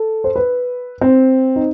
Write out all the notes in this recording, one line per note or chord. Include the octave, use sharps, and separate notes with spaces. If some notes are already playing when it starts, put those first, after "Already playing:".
Already playing: A4
C5
B4
C4
D#4